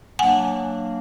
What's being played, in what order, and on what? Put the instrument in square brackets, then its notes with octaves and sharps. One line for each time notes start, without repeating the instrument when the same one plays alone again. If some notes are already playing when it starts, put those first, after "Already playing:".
[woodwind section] F#3 A#3 D4 [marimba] F#5 G#5